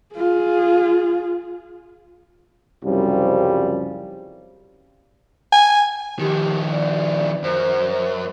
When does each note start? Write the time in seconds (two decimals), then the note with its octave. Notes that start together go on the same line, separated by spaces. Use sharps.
0.15 F4 G#4
2.83 C2 F#2 C#3 F3 G3
5.52 G#5
6.19 D#3 F3 G4
6.71 D5
7.43 F#2 C5